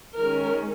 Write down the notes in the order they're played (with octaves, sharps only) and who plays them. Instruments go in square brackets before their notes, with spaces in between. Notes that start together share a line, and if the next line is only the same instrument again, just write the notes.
[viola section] D#3 G#3 C#4 A#4